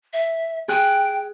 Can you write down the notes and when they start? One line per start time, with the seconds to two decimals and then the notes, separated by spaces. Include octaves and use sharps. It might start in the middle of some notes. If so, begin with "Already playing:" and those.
0.13 E5
0.68 G#4 G5 F#6